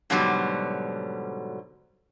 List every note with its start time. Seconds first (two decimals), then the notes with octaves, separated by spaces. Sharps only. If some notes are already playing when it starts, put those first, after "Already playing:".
0.10 G#2 B2 D3 F#3 G3